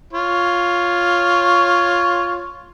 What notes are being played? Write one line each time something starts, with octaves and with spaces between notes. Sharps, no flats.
F4 C#5